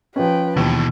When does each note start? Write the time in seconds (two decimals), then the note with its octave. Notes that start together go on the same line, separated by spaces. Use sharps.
0.16 F3 C#4 B4 G5
0.57 D#2 B2 E3 A5